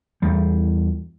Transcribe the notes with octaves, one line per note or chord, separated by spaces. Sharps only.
E2 G3